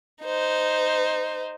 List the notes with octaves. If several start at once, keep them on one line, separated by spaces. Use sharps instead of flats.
D#4 C5